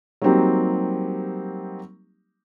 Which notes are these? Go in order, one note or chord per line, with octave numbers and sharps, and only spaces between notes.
F#3 G3 A#3 C4 D#4 G4